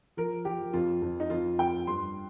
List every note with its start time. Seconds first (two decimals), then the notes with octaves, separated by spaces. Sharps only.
0.17 F3 A#4
0.45 F3 G4
0.73 F2 F4
1.02 F2
1.20 D#4
1.30 F2 F4
1.58 F2 G5
1.87 G2 C6